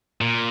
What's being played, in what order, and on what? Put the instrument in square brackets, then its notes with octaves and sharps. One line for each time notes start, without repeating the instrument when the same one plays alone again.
[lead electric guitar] A#2